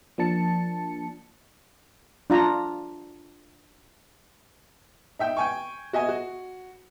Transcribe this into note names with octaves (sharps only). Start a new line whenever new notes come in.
F3 A#3 D4 A5 C#7
D4 F4 A#5
D#4 E5 G5
G5 G#5 C#6
F#4 D#5 E5 G#5
F#4